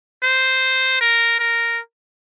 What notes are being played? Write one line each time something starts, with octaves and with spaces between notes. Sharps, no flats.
C5
A#4
A#4